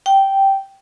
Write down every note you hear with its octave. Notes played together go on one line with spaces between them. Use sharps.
G5